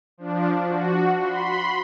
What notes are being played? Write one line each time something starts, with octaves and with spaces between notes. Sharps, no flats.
F3 D4
F#4
B5 C6